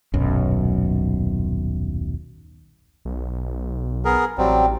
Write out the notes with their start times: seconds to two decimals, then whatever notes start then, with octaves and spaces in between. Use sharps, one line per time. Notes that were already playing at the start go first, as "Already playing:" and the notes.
0.14 D#1 B1 F#2
3.05 B1
4.05 B3 G#4 A#4
4.38 A1 F#3 G3 C4